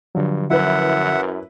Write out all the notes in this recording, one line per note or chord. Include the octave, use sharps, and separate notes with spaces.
G2 D3 F3 F#3
F#2 E4 B4 E5 F#5